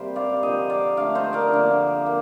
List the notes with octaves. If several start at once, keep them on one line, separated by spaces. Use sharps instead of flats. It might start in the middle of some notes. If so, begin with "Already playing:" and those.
Already playing: C3 G3 A#3 A#4 C5
D5 F5
D3 F3 A#3 D#5 G5
D5 F5
D3 A3 D5 F5
C5 D#5
A#4 D5
D3 F3 A#3
A#3